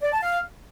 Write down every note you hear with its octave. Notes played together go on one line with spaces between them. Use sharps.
D5
A5
F5